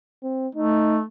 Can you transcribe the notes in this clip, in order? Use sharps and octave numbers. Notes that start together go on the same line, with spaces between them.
C4
A3 D#4